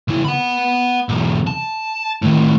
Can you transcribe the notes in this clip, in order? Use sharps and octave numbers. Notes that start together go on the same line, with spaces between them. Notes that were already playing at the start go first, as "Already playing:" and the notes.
C#3 E4
F#5 B5
B1 E2
A5
A2 D#3